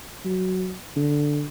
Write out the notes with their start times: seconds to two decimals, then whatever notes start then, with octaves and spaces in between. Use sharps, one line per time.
0.25 F#3
0.96 D3